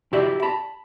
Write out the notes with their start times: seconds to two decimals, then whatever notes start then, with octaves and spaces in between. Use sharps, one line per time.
0.13 E4 F#4 G4 D5 E5
0.42 A5 B5